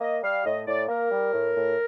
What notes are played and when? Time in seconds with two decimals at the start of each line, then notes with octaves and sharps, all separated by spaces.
0.01 A#3 D#5
0.22 G3 F5
0.45 A2 D#5
0.67 A2 D5
0.89 A#3 A#4
1.12 G3
1.33 A2
1.56 A2